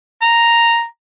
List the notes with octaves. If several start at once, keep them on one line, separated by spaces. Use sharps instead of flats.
A#5